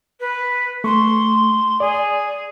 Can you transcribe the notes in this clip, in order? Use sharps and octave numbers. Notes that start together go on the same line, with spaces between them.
B4
A3 C6 C#6
G#4 D5